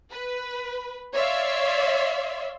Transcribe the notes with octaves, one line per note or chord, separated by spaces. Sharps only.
B4
C#5 D5 E5 F5 C6